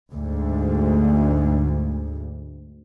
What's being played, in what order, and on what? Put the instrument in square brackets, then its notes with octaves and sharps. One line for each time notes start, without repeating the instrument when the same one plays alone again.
[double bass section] D2 G#2